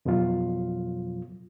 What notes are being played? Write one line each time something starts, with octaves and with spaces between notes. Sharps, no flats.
F2 B2 F3 F#3 F4